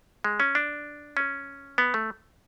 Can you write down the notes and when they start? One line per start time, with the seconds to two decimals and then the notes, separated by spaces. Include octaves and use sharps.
0.24 G#3
0.40 C#4
0.55 D4
1.17 C#4
1.78 B3
1.94 A3